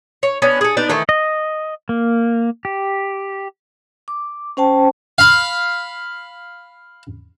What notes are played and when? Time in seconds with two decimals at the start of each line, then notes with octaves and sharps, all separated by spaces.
0.23 C#5
0.42 B3 C#4 D4
0.61 G#4 A4
0.77 B3 D4 D#4 D5
0.89 D#3 E3 A3
1.09 D#5
1.89 A#3
2.65 G4
4.08 D6
4.57 C#4 C5 G5 A5
5.18 F5 B5